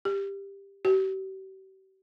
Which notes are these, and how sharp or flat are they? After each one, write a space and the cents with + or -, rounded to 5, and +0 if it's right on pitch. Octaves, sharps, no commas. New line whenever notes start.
G4 +15
G4 -40